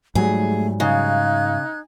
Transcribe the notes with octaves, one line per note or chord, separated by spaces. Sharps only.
G#2 F#3 G3 A3 G#4
C#3 D#4 F5 F#6 G#6